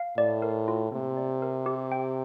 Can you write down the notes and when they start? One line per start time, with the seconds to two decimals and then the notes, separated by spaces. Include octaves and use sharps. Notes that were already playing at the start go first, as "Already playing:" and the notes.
Already playing: F5
0.17 A2 D5
0.42 A#4
0.68 F4
0.92 C3 A#3
1.17 D5
1.42 A#4
1.66 G4
1.92 G5